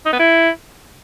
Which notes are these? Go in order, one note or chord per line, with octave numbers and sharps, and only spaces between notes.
D#4
B3
E4